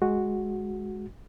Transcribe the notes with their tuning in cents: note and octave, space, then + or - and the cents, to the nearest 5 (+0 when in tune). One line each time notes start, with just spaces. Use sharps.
G#3 +0 F#4 -5